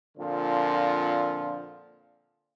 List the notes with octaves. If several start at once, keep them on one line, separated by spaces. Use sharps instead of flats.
A#2 D3 F3 C4